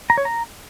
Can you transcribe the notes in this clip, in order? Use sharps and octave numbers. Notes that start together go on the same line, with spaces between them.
A#5
C#5
A#5